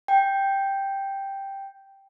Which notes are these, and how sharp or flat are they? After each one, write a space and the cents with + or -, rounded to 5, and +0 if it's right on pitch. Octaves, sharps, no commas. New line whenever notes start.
G5 +0